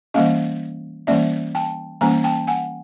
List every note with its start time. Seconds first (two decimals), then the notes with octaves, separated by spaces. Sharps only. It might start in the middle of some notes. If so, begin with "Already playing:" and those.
0.14 E3 G3 A#3 C#4 D#5 F5
1.07 E3 G3 A#3 C#4 D5 E5
1.55 G5 A5
2.01 E3 G3 A#3 C#4 G#5 A#5
2.24 G5 A5
2.47 F#5 G#5